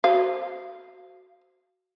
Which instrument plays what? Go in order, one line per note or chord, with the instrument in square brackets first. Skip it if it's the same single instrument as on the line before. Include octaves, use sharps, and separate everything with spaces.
[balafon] F#4 C5 [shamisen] F5